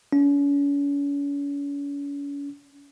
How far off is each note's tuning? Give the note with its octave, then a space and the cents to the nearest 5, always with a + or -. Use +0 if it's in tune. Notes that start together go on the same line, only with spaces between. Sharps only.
C#4 +40